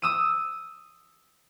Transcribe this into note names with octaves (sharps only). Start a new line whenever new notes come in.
D#6 E6 D#7